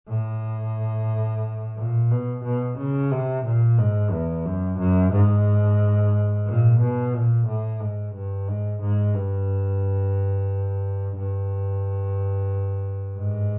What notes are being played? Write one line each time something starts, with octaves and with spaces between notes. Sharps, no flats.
A2
A#2
B2
B2
C#3
C3
A#2
G#2
E2
F#2
F#2
G#2
A#2
B2
A#2
A2
G#2
G2
G#2
G#2
G2
G2
G#2